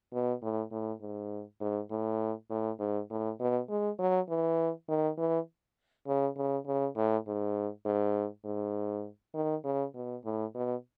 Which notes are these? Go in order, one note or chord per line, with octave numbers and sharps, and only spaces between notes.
B2
A2
A2
G#2
G#2
A2
A2
G#2
A2
B2
G#3
F#3
E3
D#3
E3
C#3
C#3
C#3
A2
G#2
G#2
G#2
D#3
C#3
B2
A2
B2